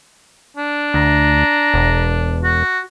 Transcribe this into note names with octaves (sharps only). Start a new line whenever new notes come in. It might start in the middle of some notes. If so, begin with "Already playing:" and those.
D4
D2 A#5
E1
F#4